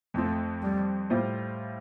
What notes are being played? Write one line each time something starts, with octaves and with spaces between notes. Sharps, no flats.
F2 F3 A3 C4
G3
A2 G3 F4 C5